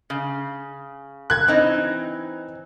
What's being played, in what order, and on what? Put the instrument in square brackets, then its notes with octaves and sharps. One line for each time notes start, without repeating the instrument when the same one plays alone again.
[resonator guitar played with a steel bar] C#3
[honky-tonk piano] F#6 G#6
[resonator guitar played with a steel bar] E3 C4 D#4